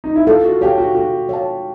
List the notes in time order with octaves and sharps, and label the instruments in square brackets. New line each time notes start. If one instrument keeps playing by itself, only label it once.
[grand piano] D#4
E4
[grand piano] F4 [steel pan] A4
[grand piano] F#4
[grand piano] G4 [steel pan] C#5 F5 A5
[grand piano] F#4
[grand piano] F#4 [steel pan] A4
[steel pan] C#5 F5 A5